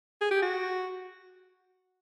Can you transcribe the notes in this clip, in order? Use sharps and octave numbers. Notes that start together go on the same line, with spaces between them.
G#4
G4
F#4